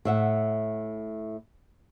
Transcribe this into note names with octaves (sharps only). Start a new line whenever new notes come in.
A2 E5 F#5